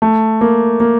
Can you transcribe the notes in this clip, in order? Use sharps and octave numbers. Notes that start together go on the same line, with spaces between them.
A3
A#3
A#3